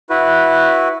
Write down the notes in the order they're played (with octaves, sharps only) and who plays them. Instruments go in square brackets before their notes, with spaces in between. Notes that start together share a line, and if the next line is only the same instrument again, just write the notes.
[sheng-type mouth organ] E4 F#4 B4